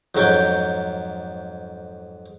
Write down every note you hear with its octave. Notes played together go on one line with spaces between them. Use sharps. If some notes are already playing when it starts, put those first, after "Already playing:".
F2 G#2 F#3 C#4 G5